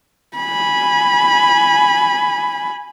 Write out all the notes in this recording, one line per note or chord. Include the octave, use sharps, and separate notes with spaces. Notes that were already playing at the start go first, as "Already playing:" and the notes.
G#5 B5